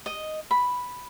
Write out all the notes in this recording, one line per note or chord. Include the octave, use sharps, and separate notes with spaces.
D#5
B5